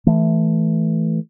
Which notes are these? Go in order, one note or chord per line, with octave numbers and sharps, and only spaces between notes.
E3 A3